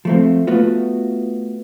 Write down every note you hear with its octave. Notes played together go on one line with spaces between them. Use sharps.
F3 A3 C4
A3 B3 F4 F#4